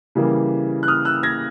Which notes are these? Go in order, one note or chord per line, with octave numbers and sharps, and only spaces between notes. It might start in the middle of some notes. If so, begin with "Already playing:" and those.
C#3 E3 G3 A#3
F#6
D#6 F6
E6 F#6
G#6 A#6